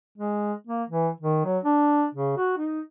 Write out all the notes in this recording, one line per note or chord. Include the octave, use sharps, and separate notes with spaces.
G#3
A#3
E3
D#3
F#3
D4
C#3
F#4
D#4